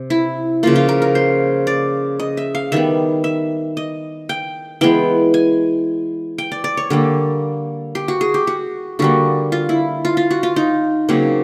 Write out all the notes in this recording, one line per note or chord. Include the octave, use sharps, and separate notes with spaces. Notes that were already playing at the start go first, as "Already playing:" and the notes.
Already playing: C3
E4
C#3 F3 A#3 F4
F4
A#4
A#4
C5
D5
D#5
E5
F5
D#3 G3 B3 E5
E5
D#5
G5
E3 G#3 B3 G5
G#5
G5
D5
D5
C#5
D3 G3 A#3
G4
F#4
G#4
G4
F#4
D3 G3 A#3 F#4
F4
E4
F4
F4
F#4
F4
D#4
C#3 F#3 A#3 C4